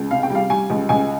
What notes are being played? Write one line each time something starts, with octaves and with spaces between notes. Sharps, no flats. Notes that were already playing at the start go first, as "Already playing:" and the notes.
Already playing: C#2
C3 F5
G5
G3 F5
G3 G#5
C#2
C#2 G#5